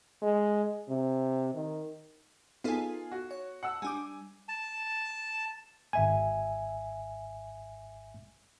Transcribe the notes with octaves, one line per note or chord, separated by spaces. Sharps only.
G#3
C3
D#3
B3 D#4 F4 G#4 A4
F#4
C#5
F#5 A5 E6
G3 D4 G#5 D6
A5
G#1 E5 G#5